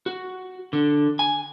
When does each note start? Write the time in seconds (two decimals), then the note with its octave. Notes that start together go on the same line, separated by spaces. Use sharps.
0.06 F#4
0.73 D3
1.19 G#5